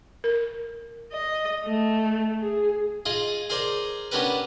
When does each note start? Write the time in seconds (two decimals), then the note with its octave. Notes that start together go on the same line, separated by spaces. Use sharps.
0.24 A#4
1.12 D#5
1.64 A3
2.41 G#4
3.06 F4 G#4 D#5
3.50 G#4 A#4 C5 D5
4.11 B3 C#4 D4 G4 A#4 B4